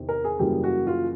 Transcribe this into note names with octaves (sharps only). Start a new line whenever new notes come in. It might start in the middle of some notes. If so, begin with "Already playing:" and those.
Already playing: E2 C3 D#3 C4
A#4
G#4
F#2 C#3 E3 G3 A#3 G4
F#4
F4